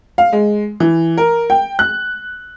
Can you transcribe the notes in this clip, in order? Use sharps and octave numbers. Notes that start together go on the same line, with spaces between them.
F5
G#3
E3
A#4
G5
F#6